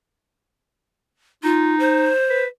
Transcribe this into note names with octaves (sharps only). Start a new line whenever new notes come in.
D#4 F4
C5
B4